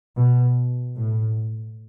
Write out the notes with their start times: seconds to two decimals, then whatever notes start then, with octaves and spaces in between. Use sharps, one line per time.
0.17 B2
0.95 A2